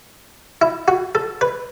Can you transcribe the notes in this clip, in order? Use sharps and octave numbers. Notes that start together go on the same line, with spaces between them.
E4
F#4
A4
B4